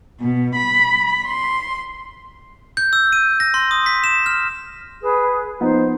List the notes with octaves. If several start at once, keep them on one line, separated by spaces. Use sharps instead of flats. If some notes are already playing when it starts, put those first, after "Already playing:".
B2
B5
C6
G6
E6
D#7
A#6
C6
D#6
B6
E7
F6
G#4 B4
F3 B3 D#4 C5